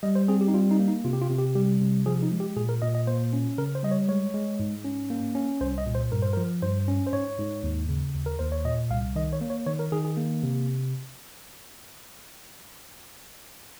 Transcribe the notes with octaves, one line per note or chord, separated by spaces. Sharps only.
G3 D#5
C5
C4 G#4
G4
D#4
G3 F4
D#4
A#3
D#4
C3 F4
G4
F4
C3
G4
G3 G4
C3
F3 G#4
D#4
G#3
G4
A#2 G#4
A#4
A#2 D#5
D#5
A#3 C5
C#4
C#3 A#4
C5
G3 D#5
C#5
G#3 C#5
G#3
G#2
C#4
A#3
C#4
C2 C5
D#5
A#2
C5
G2 A#4
C5
A#4
F3
G2 C5
C#4
C5
G#2 C#5
G#2
D#2
C#3
D#2
A#4
D#2 C5
C#5
A#2 D#5
C2 F5
D#3 D#5
C#5
A#3
C#5
D#3 C#5
A#4
D#3 G#4
G#4
A#3
C3